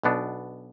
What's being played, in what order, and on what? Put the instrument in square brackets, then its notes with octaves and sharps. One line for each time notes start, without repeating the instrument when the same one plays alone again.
[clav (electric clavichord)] B1 B2 B3 D4